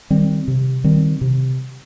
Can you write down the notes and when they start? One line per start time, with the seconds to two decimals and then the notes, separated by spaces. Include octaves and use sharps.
0.10 D#3 G3 C4
0.48 C3
0.84 D#3 G3 C4
1.21 C3